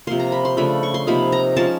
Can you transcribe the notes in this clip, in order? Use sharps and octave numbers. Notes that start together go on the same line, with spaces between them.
C3 F3 A#3 C6
A#5
B5
C6
C#3 F3 A3 D4 B5
C#6
C6
C3 F3 A#3 D#4 B5
A#5
F3 G#3 C#4 A5